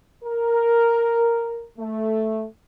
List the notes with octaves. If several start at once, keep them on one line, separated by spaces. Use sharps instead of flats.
A#4
A3